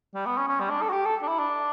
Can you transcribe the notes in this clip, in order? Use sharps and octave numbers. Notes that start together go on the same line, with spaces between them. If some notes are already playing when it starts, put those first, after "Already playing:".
G3
B3
C#4
C#4
G3
D4
A4
F#4
G4
A4
D4
E4
D4